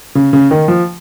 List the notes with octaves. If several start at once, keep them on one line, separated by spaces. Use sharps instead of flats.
C#3
C#3
D#3
F3